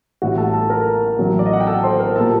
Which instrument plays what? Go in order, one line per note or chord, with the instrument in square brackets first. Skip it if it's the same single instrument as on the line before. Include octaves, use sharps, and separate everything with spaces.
[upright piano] A1 A2 G3 F#4 F#5
A4 A5
A4 A5
A#4 A#5
A1 A2 F#3
D5
D#5
F#5
G5
A4 A5
C5 C6
A#4 A#5
A#2 G3 A4 A5